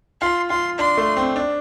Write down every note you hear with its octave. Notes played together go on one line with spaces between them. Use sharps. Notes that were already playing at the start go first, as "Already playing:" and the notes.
F4 C6
F4 C6
D4 C6
A3
C4
D4